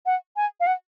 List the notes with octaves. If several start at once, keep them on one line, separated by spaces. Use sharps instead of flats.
F#5
G#5
F5
F#5